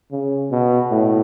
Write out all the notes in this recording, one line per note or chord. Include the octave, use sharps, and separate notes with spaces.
C#3
B2
A2